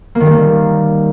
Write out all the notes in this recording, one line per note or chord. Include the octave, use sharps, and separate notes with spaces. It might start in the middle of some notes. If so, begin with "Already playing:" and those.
A#3
D#3
G3
A#3